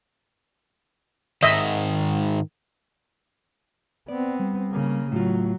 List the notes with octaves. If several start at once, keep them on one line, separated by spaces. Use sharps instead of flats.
G#2 D#3 D#5 E5
B3 C4 D5
G3
C#3 A#3
A2 F#3 F4